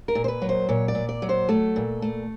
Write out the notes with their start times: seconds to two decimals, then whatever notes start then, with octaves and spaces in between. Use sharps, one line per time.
0.08 A#4
0.15 A#2
0.24 C5
0.28 B4
0.42 F#3
0.49 C5
0.69 A#2 C#5
0.88 D5
0.95 A#2
1.09 D5
1.22 F#3
1.29 C5
1.49 A3 A4
1.76 A#2
2.02 A3